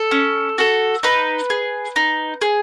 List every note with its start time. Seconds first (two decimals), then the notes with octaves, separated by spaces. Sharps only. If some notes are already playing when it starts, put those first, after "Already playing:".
Already playing: A4
0.11 C#4
0.58 F#4 A4
1.03 D#4 B4
1.50 G#4
1.96 D#4
2.42 G#4